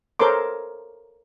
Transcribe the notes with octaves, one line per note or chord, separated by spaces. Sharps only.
A4 A#4 C5 C#5 C6 D6